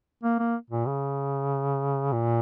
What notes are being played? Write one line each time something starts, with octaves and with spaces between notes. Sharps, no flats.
A#3
A#3
A#2
C#3
A#2